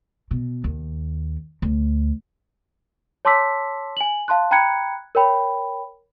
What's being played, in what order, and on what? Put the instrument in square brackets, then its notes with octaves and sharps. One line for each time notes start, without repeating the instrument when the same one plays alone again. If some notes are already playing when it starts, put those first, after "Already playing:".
[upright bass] B2
D#2
D2
[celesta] C#5 A5 C6 D6 E6 B6
G#5 F#7
F5 A5 C6 F#6
G5 A#5 B5 F#6 G#6 C#7
A#4 C#5 G5 B5